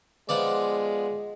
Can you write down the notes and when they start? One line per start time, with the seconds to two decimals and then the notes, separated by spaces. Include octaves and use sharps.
0.29 F3 G#3 B3 D5